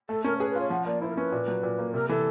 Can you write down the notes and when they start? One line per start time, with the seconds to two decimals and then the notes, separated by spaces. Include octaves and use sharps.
0.09 A3 A4
0.24 C#4 A#4
0.36 C5
0.39 G#4 B4
0.50 B4
0.55 F4 C#5
0.70 F3 F#5
0.86 A#3 D5
1.01 E4 C5
1.09 A#4
1.16 C#4 B4
1.32 A#2
1.48 F#3
1.63 A#2
1.79 A#3
1.93 C3 A#4
2.08 E3 A4